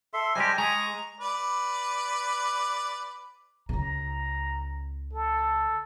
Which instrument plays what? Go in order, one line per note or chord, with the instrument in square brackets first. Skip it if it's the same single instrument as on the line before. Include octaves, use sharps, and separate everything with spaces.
[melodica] A4 E5 C6
[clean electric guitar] G3 G#3 G4 [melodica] C5 D#5 A5 [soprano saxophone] G#5
[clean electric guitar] G#3 [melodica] G#4 G#5 C#6 [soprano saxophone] A#5
[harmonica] B4 D5
[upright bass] C#2 C#3 [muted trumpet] A#5
[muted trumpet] A4